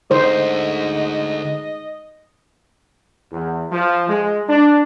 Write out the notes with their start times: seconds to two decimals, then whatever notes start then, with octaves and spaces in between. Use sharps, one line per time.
0.11 D2 G#2 C5 D#5
3.32 E2
3.72 F3
4.09 G#3
4.49 D4